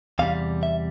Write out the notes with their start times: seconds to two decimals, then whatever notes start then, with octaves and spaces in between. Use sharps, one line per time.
0.19 E2 C3 G3 F5
0.63 E5